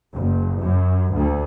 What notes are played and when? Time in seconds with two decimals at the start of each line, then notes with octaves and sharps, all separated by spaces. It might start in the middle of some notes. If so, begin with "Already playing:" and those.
0.13 F#1
0.60 F#2
1.13 D2